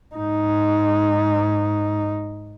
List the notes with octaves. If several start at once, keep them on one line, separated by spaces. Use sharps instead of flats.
G#2 D#4